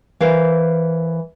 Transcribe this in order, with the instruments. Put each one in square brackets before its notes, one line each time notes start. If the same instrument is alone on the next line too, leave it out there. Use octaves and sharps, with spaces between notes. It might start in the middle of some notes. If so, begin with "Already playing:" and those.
[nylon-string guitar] E3 A#4 C5 F5